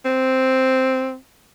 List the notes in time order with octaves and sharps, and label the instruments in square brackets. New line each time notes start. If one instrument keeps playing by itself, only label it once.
[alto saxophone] C4